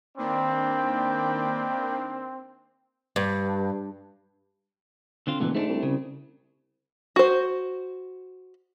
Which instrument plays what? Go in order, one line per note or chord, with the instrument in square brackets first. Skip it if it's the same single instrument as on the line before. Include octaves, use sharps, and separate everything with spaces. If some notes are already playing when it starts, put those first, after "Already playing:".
[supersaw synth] D#3 A#3 D4 [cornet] C4 [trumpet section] B4 D5 G5
[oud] G2
[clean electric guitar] D3 C4 F4
[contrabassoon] F1 [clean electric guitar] C#2 A#2 E3
[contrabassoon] G#2 [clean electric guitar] A3 C4 D4
[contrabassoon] C2
[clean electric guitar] C#3
[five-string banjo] F#4 C5